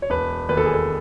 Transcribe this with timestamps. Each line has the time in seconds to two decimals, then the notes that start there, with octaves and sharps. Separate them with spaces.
0.02 C#5
0.10 E1 B4
0.49 D#2 B4
0.57 A4
0.65 G#4
0.73 A4